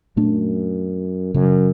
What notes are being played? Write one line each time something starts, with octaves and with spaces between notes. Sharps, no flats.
F#2 A#2 A3 D4
F#2 C#3 F#3